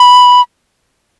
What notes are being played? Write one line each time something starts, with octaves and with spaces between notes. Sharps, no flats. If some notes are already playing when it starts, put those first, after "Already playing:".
Already playing: B5